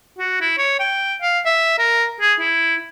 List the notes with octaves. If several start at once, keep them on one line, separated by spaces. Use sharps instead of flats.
F#4
E4
C#5
G5
F5
E5
A#4
G#4
E4